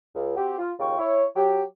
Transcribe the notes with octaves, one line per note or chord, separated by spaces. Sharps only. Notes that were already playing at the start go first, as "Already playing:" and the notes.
C#2
C4 F#4 G4
F4
D#2 C#3 F4 G5 C#6
E4 C#5
F#3 G4